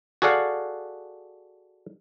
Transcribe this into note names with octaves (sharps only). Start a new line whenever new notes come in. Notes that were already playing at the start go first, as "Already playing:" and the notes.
F#4 G#4 A4 D5 F5 F#5